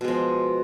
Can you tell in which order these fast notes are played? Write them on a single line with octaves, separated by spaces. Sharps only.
B2 G#3 F3